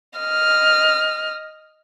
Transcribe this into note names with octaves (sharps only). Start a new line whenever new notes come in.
D#5 F6